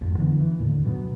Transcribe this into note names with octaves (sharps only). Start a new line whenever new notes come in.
G#1 F2
D3 E3 B3
E3
D#2 A2 D3
B2 F#3 G#3 B3